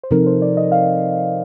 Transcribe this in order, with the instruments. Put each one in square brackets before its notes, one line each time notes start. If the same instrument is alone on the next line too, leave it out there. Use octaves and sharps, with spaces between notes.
[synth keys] C5
[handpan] C3 F3 C4 D#4 A4 [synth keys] A#4
[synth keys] C5
D5
D#5
F5